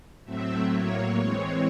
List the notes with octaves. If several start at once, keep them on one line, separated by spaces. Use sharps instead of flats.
A2 F#3 A3 C4 E5
A2 F#3 A#3 C#5
E3 G#3 C4